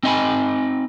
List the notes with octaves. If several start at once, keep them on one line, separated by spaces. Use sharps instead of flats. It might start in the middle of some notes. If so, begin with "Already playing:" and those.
C4 D#4 D#5 F5 G#5 B5